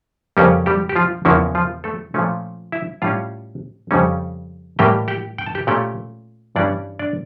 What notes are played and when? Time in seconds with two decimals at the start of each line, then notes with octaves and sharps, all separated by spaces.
0.37 F2 C#3 G3 A#3 C#4 G4
0.66 G3 G4
0.89 G4
0.96 F3 F4
1.25 E2 C#3 E3 F3 A#3 C#4 E4
1.55 F3 F4
1.84 A3 A4
2.14 A#2 F3 A3 C#4
2.72 E4 E5
3.02 A2 G3 C#4 F4 F5
3.91 F2 C#3 G3 C#4
4.79 A2 E3 G3 A#3 G4 G5
5.08 G4 G5
5.38 G5
5.46 A5
5.55 G4 G5
5.67 A#2 A3 C#4 G4 G5
6.56 G2 E3 G3 C#4 D4 D5
6.99 D4 D5